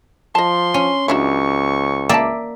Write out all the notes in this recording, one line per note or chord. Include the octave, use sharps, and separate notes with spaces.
F3 D#5 A5 C6
C#4
C#2 F#3 D4 E4 C#6
A#3 D5 E5 G5 A5